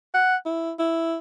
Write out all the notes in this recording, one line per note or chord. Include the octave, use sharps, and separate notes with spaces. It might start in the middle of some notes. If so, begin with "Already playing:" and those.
F#5
E4
E4